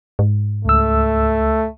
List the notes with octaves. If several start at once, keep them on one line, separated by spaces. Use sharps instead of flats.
G#2
C#2 A3 E6